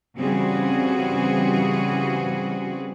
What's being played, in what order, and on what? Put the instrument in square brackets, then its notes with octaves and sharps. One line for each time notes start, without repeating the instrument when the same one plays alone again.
[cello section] C#3 E3 G3 C4 F#4 G#4